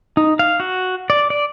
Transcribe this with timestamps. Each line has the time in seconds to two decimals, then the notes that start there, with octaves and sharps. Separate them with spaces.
0.17 D#4
0.39 F5
0.60 F#4
1.10 D5
1.30 D5